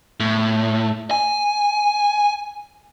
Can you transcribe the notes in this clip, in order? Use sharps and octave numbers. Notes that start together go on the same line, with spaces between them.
A2
G#5